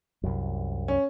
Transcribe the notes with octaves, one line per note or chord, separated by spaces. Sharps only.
C2 F#2
C#4